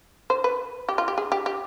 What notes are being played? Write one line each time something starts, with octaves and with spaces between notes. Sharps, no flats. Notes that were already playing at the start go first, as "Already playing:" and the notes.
C5
B4
G4
F4
G4
G#4
G4
G4